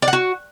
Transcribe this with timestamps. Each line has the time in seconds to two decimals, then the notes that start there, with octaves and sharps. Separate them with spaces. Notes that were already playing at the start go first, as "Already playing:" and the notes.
0.02 D5
0.08 F#5
0.13 F#4